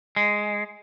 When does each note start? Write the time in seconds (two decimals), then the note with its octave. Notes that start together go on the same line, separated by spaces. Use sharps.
0.16 G#3